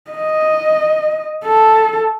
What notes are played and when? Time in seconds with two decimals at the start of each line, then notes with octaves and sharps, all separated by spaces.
0.12 D#5
1.44 A4